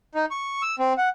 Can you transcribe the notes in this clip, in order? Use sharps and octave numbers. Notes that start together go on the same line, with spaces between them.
D#4
C#6
E6
C4
F#5